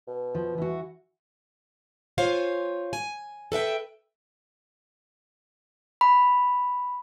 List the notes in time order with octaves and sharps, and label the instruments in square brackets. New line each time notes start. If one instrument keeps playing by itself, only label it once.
[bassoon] B2
[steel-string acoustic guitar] F3
E3 F#4
F4 C5 C#5 F5 G#5
G#5
A4 B4 E5 G5
[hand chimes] B5